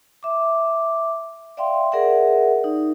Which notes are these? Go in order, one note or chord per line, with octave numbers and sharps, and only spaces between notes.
E5 D6
D5 E5 F5 G5 C6
G#4 A#4 D5 E5 F#5
D#4